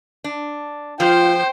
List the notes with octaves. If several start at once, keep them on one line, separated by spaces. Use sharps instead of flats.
D4
F3 F4 C5 G5